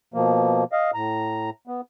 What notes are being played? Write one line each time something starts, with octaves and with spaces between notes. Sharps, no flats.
B2 F3 A#3
D#5 F5
A2 A#5
B3